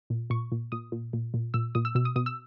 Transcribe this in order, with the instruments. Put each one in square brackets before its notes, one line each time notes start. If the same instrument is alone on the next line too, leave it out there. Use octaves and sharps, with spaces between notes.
[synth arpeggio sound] A#2
A#2 C#6
A#2
A#2 D#6
A#2
A#2
A#2
A#2 E6
A#2 D#6
E6
B2 E6
D#6
B2 D#6
E6